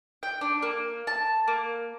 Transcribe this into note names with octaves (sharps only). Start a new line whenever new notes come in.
G5
D4
A#3
A5
A#3